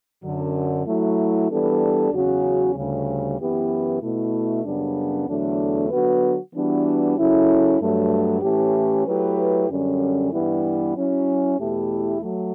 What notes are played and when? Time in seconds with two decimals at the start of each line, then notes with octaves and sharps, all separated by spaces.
0.22 F#2 D3 F#3
0.85 F#3 A3 E4
1.48 E3 G3 B3 D4 A4
2.11 E2 C#3 F#3 C#4 F#4
2.75 D2 C#3 G3
3.38 F#2 E3 B3 E4 G4
4.01 B2 A3 E4
4.64 F#2 C#3 G3 B3 D4
5.27 E2 D3 F#3 A3 D4
5.90 D3 F#3 B3 F#4 B4
6.53 E3 G3 B3 D4 F#4
7.16 C#3 F#3 C#4 E4 A4
7.79 G2 F#3 A3
8.42 A2 E3 A3 C#4 G4
9.05 F#3 A3 E4 G4 B4
9.68 F#2 D3 G3 C#4
10.32 G2 E3 G3 B3 E4
10.94 F#3 C#4 E4
11.57 E2 B2 A3 E4 G4
12.21 F#3 A3